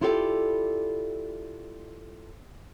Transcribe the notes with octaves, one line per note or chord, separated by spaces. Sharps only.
E4 F4 G4 A4 A#4 D5